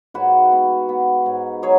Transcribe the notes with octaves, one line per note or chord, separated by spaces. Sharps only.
G#2 F#4 B4
B3
B3
G#2
F#3 G#4 C#5